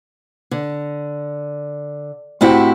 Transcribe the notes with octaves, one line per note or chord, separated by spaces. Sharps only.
D3
A2 C4 E4 F#4 G4